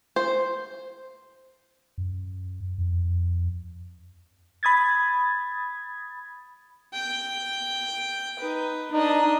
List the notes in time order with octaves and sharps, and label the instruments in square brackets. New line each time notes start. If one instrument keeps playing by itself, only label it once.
[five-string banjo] C5
[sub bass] F#2
F2
[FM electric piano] B5 D#6 G#6 A6
[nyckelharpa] G5
D#4 B4
[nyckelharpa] D4 D#5 [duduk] D#4